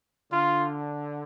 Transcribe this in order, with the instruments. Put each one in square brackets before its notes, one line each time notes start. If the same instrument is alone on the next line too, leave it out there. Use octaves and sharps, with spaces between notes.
[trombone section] D3 [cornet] F4